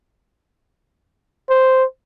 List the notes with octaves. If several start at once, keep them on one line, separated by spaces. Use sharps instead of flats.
C5